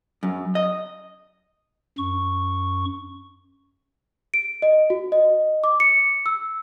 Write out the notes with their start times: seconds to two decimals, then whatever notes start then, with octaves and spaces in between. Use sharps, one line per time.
0.23 F#2
0.55 D#5
1.98 F#2 C#6
4.34 D7
4.62 D#5
4.90 F#4
5.12 D#5
5.64 D6
5.80 C#7
6.26 E6